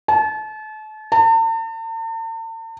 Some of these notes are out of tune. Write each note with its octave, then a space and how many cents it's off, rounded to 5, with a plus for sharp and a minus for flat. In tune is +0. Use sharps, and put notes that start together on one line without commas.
A5 -35
A5 +45